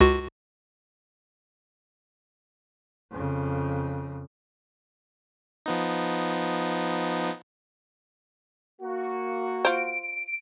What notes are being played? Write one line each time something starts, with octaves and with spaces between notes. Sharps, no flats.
C#2 F#4
F2 C#3
F3 B3 D#4
A#3 F#4
F4 C5 D7